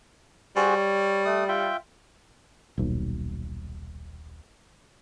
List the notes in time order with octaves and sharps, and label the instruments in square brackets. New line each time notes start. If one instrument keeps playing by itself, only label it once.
[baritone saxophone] G3 [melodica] F#4 G#4 C5
[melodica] C#5
A3 D#6
F4 E5 G5
[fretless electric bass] D#1 B1